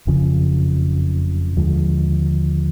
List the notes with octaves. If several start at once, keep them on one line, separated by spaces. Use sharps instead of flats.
F#1 F2 C#3 F3
D#2 D3 F3 G#3